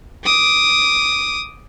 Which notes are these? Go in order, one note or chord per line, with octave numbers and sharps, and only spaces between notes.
D6 D#6